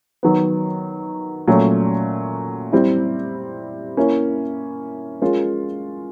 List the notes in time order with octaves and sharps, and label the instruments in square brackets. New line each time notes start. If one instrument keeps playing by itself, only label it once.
[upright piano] D#3 F#3 B3
A#2 F#3 A3 C#4
G3 C4 E4
A#3 C#4 E4
G#3 C#4 F4 A#4